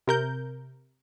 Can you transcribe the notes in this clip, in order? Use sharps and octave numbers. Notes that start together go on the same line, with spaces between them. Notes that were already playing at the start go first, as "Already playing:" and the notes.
C3 A#4 G6